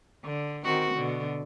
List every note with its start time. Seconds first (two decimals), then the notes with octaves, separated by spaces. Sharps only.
0.24 D3
0.65 D#3 C4 F#4
0.95 B2 D3